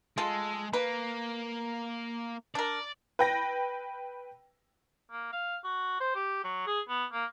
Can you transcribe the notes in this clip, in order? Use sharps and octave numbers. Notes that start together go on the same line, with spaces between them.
G#3 F4 A4
A#3 B4
D4 A#4 D5
B4 G5 A#6
A#3
F5
F#4
C5
G4
F#3
G#4
B3
A#3